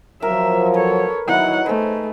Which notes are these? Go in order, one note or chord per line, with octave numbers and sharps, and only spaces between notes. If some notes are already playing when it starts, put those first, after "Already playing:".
F3 F#3 A#4 E5
A4 B4 C#5
F#3 D#4 E4 F#5
A3 G#4 B4 C5